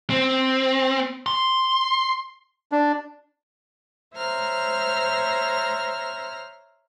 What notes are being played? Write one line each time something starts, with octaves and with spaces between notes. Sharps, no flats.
C4
C6
D4
C5 C#5 E5 A#5 F6